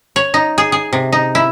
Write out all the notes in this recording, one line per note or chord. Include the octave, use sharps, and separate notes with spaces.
C#5
D#4
G#4
G#4
C3
D#4
E4